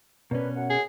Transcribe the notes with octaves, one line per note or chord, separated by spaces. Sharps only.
B2 C#4 D4 A#4 B4
F#2 F#5
G#4